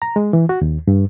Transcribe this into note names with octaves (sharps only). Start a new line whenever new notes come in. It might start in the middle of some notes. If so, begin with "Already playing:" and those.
A#5
G#3
E3
F#4
D#2
G2